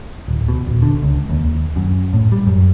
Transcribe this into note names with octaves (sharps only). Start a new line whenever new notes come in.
D1
B2
D#1
D3
C#2
D#2
F#2
A2
G3
F#2